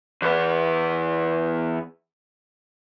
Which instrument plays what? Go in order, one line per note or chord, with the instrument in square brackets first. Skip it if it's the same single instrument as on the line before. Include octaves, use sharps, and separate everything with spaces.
[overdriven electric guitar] E2 B3